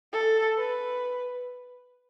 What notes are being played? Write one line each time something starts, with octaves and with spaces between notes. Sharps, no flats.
A4
B4